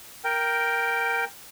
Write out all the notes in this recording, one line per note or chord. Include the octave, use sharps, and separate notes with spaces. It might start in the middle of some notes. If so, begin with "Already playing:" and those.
A#4 G5